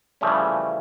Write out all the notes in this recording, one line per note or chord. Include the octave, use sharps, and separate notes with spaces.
C#3 E3 F3 G3 A3 C#4